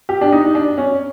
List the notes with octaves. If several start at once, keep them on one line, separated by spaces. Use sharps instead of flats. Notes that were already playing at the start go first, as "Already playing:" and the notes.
G4
D4
D#4
D4
C#4